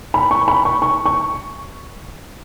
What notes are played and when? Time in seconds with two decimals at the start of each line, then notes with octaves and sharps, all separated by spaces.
0.14 B5
0.31 C#6
0.48 B5
0.65 C#6
0.82 C#6
1.06 C#6